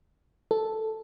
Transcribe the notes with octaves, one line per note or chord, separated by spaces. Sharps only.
A4